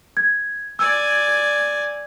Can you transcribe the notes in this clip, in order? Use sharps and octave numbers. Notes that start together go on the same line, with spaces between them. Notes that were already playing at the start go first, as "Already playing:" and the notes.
G#6
D5 G#5 E6